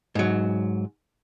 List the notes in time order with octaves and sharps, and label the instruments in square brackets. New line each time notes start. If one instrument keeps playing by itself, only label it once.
[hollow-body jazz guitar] G#2 F#3